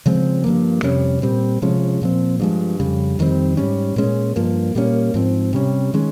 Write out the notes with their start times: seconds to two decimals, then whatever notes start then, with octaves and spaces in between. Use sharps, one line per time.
0.06 C#3 F3 G#3 C4
0.44 G2 F3 A#3
0.83 F2 C3 G3 C#4
1.22 A#2 G3 C4
1.62 C3 F3 G#3 C#4
2.02 A#2 F3 C4
2.40 G2 F3 G#3
2.80 F2 C#3 G3
3.19 F2 D#3 G3 C4
3.57 G#2 G3 C#4
3.96 A#2 G#3 C#4
4.36 G2 F3 A#3
4.75 A#2 G3 A#3 C#4
5.14 G#2 F3 C4
5.53 C3 G3 C#4
5.94 D#3 G#3 C#4